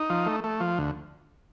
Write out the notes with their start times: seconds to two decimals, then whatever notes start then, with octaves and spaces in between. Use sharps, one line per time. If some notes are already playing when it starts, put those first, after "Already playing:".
Already playing: D#4
0.10 F3
0.26 A3
0.44 A3
0.60 F3
0.78 D2